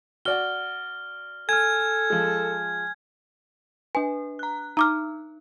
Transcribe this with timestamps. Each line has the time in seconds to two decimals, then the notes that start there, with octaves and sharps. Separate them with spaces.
0.25 F#4 D5 F#5 F6 G7
1.49 A4 G#5 F6 G#6
2.10 F3 G#3
3.95 D4 B4 G#5
4.39 A#5 F#6
4.77 D#4 A#5 D6 F6